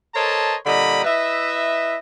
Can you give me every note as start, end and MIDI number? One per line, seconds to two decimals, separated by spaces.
0.15 0.56 69
0.15 0.56 70
0.15 0.56 72
0.15 0.56 73
0.15 0.56 75
0.15 0.56 81
0.66 1.04 46
0.66 1.04 50
0.66 1.04 55
0.66 1.04 75
0.66 1.04 82
0.66 1.04 83
1.05 1.96 64
1.05 1.96 71
1.05 1.96 75
1.05 1.96 76